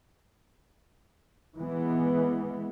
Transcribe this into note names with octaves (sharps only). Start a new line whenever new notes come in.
E3 G#3 B3